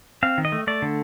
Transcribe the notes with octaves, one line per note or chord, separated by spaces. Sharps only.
C4 F5
D#3
D#5
A3
A3 D5
D3